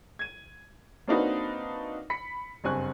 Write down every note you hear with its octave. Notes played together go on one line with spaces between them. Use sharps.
G#6 D#7
A#3 C4 D4 D#4 F#4 B4
B5 B6 C#7
F#1 G2 C4 G#5 C#6 F#6